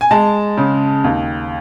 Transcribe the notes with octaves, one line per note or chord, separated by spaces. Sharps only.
G#5
G#3 A5
C#3
D#2